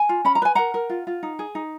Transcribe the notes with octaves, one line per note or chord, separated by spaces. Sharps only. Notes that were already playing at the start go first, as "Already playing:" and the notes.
Already playing: G#5
F4
C#4 B5
A#5
B4 G#5
A#4 F#5 A#5
A#4
F4
F4
D#4
G#4
D#4